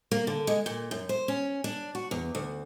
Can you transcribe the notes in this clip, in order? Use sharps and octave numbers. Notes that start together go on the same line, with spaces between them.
A#3
D3
G#3
A#2
F#2
C5
C#4
D4
F#4
E2
D2